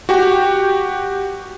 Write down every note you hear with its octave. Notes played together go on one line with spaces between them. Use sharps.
F#4 G4 G5